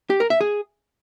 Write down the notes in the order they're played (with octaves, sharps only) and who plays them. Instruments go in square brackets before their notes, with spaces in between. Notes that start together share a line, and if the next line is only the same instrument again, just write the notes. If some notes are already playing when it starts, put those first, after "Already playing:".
[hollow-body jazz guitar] G4
A#4
E5
G#4